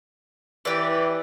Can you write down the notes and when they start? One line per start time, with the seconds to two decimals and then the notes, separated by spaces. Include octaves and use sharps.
0.65 E3 G4 D5